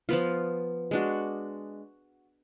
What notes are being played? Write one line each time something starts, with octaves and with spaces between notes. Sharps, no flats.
F3 B3 F4
G#3 D4 F#4